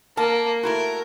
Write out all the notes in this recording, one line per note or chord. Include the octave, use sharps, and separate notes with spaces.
A#3 A#4 A5
A3 E4 F#4 A#4